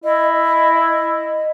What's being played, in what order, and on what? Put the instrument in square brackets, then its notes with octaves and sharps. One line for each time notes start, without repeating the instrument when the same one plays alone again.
[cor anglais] E4 [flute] D#5